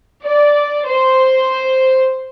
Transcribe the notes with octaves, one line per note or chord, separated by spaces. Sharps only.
D5
C5